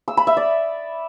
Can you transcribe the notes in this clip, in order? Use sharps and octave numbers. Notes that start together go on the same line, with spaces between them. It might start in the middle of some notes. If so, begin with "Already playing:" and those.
E6
B5
E5
D5